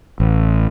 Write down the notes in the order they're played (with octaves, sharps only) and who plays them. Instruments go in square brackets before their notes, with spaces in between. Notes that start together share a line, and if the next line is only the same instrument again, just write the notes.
[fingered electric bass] A1